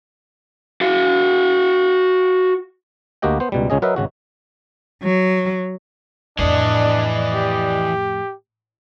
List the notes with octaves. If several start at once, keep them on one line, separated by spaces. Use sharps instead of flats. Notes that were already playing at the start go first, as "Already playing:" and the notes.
F#4 F5
D2 A#3 F#4 G4 D#5 G5
B3 C5
C#2 B2 G3
C#2 C#3 C#4 G#4 D#5
F#3 A#4 B4 D#5 E5
G#1 C#3 F#4
F#3
F2 A2 E3 D4 G#4 D5 D#5
G4